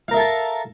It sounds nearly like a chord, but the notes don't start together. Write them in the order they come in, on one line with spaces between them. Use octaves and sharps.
F5 A#4 E5 A4 A5